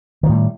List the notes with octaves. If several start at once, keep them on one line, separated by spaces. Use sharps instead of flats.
A2 D#3 F3 G3